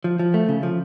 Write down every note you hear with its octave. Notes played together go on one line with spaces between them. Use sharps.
F3
F3
A3
C#3
F3